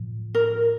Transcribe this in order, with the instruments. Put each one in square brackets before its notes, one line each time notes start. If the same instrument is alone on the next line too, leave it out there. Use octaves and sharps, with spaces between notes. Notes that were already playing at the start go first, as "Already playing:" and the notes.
Already playing: [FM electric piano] A2 F3
[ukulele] A#4